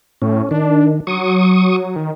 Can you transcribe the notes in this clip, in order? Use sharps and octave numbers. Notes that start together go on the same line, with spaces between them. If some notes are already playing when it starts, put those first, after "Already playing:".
A2 C#4
D#3 D4
F#3 C#6 D#6
D#3